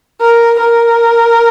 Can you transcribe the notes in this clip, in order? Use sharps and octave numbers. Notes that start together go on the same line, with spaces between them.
A#4
A#4